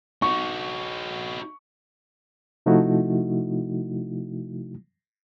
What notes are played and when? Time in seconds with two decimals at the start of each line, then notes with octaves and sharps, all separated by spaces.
0.22 D#4 F#4 C#6
2.66 C3 F3 A3 D#4 E4 F#4